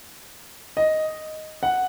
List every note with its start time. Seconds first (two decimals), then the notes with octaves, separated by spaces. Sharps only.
0.77 D#5
1.63 F#5